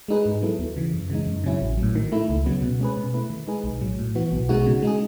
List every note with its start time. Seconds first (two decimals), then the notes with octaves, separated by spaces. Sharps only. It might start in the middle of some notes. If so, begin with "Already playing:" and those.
0.08 G#3 D#4 G#4 B4
0.25 G#2
0.42 F#3 B3 E4 A4
0.59 D#2
0.76 C#3 E3
0.93 F#2
1.10 C#3 E3 G#3 D#4
1.27 F#2
1.44 C#3 F#3 C#4 E4
1.61 A1
1.78 F#3
1.83 A2
1.95 D#3
2.12 A3 E4
2.29 C#2
2.46 C#3 F#3 B3
2.62 B2
2.80 G#3 C#4 G#4 B4
2.97 B2
3.13 A3 E4 B4
3.30 D#3
3.47 G#3 D#4 G#4 B4
3.64 B1
3.81 A2 F#3
3.99 A2
4.15 E3 B3 F#4
4.32 B1
4.49 B2 G#3 D#4 F#4
4.66 C#3
4.82 G#3 D#4 G#4